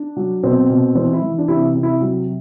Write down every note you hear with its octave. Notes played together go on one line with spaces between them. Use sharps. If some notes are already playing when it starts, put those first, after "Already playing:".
Already playing: D4
F#3
B2 C4
B2
E3 C4
E4
E3
D4
C3 E4
C3
E4
F#3